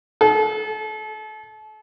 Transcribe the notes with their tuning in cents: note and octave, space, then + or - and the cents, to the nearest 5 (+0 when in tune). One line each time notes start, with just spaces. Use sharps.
A4 -35